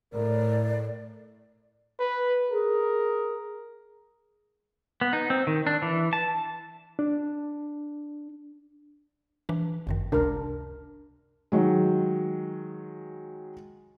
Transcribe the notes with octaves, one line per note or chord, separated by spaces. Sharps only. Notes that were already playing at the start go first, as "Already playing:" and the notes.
A2 A#4 D5
B4
G#4 A#4
B3
D#4
C4
D#3
D4
E3
A5
D4
E3 D4
G1 F#2 D#3
C#2 C3 D4 A#4
D#3 F#3 G#3